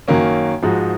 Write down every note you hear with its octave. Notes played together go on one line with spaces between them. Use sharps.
F#2 D#3 F#3 A#3 C#4
G#2 F3 G#3 D#4 F#4